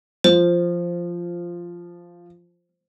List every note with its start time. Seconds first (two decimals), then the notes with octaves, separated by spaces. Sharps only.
0.24 F3 C5